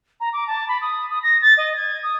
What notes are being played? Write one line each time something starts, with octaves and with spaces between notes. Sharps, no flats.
A#5
D6
A5
B5
D#6
D#6
A#6
A6
D#5
G#6
D#6